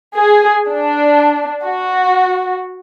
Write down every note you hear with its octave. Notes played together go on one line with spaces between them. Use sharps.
G#4
D4
F#4